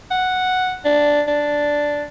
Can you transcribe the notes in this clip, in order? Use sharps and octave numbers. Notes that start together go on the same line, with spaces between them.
F#5
D4
D4